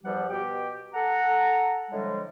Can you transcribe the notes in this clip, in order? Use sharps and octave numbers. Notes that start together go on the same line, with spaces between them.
E2 G2 F3 G3 G4 F#5
B2 G4 G5
A4 F#5 A#5
A2 D3 F3 G3 G#3